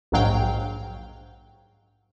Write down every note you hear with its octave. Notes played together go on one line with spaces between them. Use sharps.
A#1 D#2 G#2 F#3 F5 G5